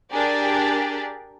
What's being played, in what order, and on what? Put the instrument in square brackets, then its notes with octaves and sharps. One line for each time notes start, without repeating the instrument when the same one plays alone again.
[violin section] D4 G4 G#4 A#4 D5